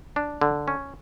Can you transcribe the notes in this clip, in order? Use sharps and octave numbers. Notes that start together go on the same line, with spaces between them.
D4
D3
C#4